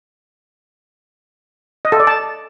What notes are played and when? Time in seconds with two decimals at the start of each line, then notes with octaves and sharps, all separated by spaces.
1.85 D#5
1.92 A4
2.00 D5
2.07 A5